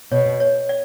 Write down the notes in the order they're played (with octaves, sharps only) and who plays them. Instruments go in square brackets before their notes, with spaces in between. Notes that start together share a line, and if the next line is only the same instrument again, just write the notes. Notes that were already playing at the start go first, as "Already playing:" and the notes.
[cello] B2 [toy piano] C#5
[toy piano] C#5
D5